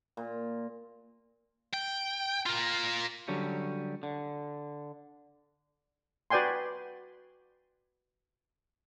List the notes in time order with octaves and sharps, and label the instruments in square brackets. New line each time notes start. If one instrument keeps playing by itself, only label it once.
[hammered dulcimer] A#2
[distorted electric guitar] G5
F4 A#4
[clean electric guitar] D3 F#3 G3 C#4
D3
[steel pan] F#4 B4 D5 G5 G#5 C6